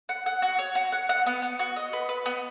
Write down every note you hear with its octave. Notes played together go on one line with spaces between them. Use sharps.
F#5
F#5
F#4
C#5
F#4
F#5
F#5
B3
B3
F#4
D#5
B4
B4
B3